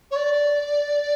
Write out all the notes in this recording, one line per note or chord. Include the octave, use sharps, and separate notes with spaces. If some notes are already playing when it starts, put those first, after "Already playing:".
C#5
D5